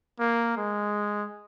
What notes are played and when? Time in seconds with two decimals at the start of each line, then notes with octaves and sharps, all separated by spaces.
0.19 A#3
0.57 G#3